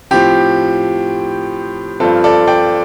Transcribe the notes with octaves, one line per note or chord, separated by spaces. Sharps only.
A2 F3 C4 G4
G2 F3 C4 F4 A4
A4 D5
D5 G5